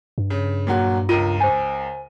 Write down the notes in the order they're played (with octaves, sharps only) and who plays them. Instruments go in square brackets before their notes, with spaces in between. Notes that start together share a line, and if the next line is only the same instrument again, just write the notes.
[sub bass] G2
[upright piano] C#3
A#2 F#3 F#4
[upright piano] C#2 A#4 D#7 [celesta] F4
[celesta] C5 G#5